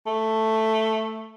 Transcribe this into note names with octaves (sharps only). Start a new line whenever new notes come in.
A3